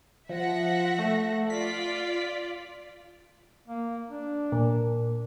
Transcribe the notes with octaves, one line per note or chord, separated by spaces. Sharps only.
F3 E5 F#5 A#6
A3
F4 D5 B6
A#3
D4
A#2